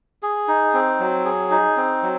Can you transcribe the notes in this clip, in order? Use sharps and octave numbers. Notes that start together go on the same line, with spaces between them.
G#4
D#4
C4
F#3
G#4
D#4
C4
F#3